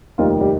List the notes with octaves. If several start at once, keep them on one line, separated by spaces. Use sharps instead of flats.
F1 D#2 D#3 G3 F4
G3 G4